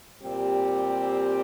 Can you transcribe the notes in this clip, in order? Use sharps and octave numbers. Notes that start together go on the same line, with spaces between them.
A#2 G3 C4 G4